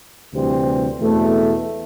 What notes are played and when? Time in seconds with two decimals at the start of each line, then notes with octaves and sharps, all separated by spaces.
0.33 D2 C3 E3 G3 C4
1.00 E2 B2 A3